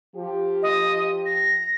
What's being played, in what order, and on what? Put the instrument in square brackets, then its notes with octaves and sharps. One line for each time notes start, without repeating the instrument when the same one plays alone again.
[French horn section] F3 G4
[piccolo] D#5
A#6